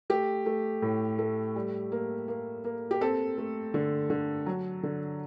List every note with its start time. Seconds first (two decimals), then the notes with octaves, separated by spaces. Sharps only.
0.10 A3 G4
0.46 A3
0.82 A2
1.19 A3
1.56 G3
1.92 A#3
2.28 A#3
2.64 A#3
2.91 G4
3.01 C4 A4
3.38 A3
3.74 D3
4.10 D3
4.46 F#3
4.83 D3